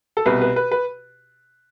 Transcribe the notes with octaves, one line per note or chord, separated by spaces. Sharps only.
A4
C2 B2 B4
B4
B4
B4